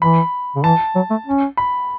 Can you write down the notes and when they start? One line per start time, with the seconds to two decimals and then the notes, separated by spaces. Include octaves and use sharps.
0.01 E3 B5
0.55 C#3
0.64 E3 A5
0.95 F#3
1.10 A3
1.26 C#4
1.57 B5